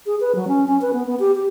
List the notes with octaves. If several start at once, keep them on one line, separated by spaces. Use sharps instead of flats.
G#4
B4
F#3
C#4
C#4
B4
B3
B3
G4
G4